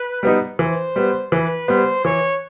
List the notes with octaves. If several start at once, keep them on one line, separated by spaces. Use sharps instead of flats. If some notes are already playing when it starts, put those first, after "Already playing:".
Already playing: B4
G3 B3 D#4
E3 C5
G3 B3
E3 B4
G3 B3 C5
E3 C#5